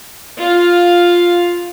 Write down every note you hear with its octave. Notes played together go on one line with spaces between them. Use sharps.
F4 F5